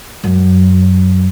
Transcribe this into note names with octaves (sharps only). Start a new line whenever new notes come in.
F#2